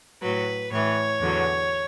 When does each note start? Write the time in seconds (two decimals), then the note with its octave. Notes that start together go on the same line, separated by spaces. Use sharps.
0.21 A2 F#3 B4
0.71 A2 E3 C#5
1.20 E2 D3 F#3